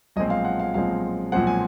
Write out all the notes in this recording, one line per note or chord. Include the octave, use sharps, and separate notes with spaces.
B1 A#2 F3 G#3 C4 D#5
F5
F#5
F5
B1 A#2 F3 G#3 C4 F5
B1 A#2 F3 G#3 C4 F#5
G#5